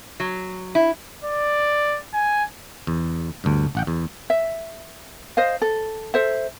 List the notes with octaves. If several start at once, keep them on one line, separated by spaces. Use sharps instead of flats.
F#3
E4
D5
G#5
E2
D2 G2
A1 F#5 G5
E2
E5
C5 D#5 F5
A4
A4 C5 E5